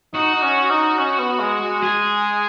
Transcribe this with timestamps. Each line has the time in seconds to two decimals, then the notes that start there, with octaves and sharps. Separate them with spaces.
0.14 D#4 F#4
0.35 D#4
0.42 C#4
0.70 D#4
0.98 C#4
1.19 B3
1.40 G#3
1.61 G#3
1.82 G#4